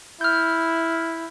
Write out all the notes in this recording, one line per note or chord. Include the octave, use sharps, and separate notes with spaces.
E4 F6 G6